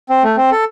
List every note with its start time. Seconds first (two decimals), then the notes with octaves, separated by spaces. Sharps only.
0.09 C4
0.23 A3
0.37 C4
0.51 A4